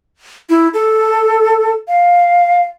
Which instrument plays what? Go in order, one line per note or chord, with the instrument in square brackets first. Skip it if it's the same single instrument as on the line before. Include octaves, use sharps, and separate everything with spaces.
[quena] E4
A4
F5